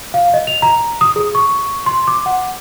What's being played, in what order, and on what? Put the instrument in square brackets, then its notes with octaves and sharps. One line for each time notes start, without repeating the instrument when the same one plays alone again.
[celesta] F5
D#5
F7
A#5
D#6
G#4
C#6
C6
D6
F#5